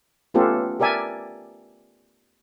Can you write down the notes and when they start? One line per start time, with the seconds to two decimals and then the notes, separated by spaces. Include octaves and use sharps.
0.34 A3 B3 C#4 F4 G4 A4
0.80 G4 A#4 D5 E5 G#5 A5